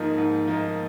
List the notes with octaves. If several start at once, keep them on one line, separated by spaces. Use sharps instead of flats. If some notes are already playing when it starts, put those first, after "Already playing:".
Already playing: G#2 F3 A#3 D#4
G#2
F3 A#3 D#4